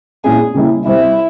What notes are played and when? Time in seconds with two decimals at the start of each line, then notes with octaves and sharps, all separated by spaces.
0.24 A#2 G#3 C#4 E4 G#4
0.54 C#3 G3 A#3 E4
0.85 C3 G3 C4 E4